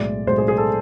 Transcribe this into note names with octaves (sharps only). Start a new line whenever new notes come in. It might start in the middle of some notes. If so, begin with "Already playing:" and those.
Already playing: B1 A2 G#3 D5
B1 A2 G#3 C5
G#4
G#4
A4